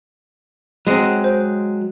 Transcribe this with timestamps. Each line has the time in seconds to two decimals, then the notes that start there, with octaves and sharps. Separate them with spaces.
0.87 F#3 G#3 C4
1.24 C5